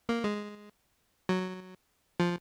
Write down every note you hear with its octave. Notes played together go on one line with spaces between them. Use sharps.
A#3
G#3
F#3
F3